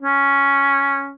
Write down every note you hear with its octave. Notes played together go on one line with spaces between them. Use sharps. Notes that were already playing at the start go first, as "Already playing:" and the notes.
C#4